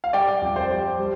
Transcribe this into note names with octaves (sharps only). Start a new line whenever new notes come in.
F5
G3 D5 G5
F2
C5
G3
G3